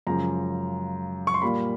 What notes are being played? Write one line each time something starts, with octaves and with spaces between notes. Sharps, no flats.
F#2 C#3 F3 G#3 A#5
C#6
C6
A#2 G3 A#3 B5